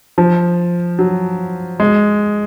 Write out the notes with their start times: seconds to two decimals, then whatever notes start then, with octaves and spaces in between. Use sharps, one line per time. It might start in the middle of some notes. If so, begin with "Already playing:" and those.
0.18 F3
0.99 F#3
1.80 G#3